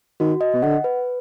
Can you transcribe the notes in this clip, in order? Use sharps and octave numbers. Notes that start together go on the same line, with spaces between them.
D#3 F#4
D#5
B2
D3 F#5
B4